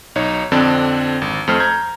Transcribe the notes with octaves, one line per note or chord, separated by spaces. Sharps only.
B1 D#4 C#5
F2 D3 C4 D4
G#1
F2 A3 C5 F6
A#5 G6 G#6